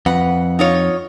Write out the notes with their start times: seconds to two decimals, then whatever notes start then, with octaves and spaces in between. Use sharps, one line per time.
0.06 F2 B4 F#5
0.59 D#4 F4 C#5